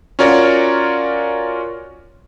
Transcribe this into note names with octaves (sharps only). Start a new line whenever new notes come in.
C#4 F4 F#4 A#4 C#5 D5